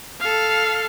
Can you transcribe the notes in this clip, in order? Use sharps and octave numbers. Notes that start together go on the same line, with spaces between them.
A4 F5